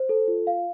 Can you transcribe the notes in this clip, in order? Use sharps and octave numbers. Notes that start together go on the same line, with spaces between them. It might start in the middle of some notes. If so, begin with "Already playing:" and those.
Already playing: C5
A4
F4
F5